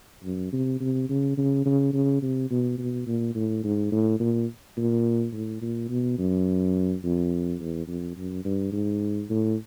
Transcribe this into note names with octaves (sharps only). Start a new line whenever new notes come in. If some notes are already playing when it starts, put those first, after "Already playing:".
F#2
C3
C3
C#3
C#3
C#3
C#3
C3
B2
B2
A#2
A2
G#2
A2
A#2
A#2
A2
A#2
B2
F#2
F2
E2
F2
F#2
G2
G#2
A2